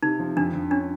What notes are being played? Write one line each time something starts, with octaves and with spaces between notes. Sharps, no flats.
C3 D#4
F3
F2 D4
F2
C#4 D4